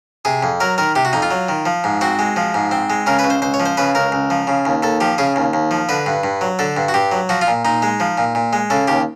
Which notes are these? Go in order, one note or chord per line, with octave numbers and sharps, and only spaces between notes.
C3 G#4
F2
F#3 A#4
D#3 A#4
C3 G4
F#4
F2 D#4
F4
F#3
D#3
F3
G#2
C4 F#4
G#3
F3
G#2
C4
G#3
C#3 A#4
B4
C#2
C5
C#2 C5
C#5
F3
C5
C#3 B4
C#2 A#4
C#2
F3
C#3
D#2
D#2 A4
F3 G4
C#3 G#4
D#2
D#2
F3
D3 B4
G2
G2
F#3
D3 A4
G2
F#4
G2 G4
F#3
F3 F#4
F4
A#2
A#2 D#4
G#3
F3
A#2
A#2
G#3
C#3 A4
D#2 G4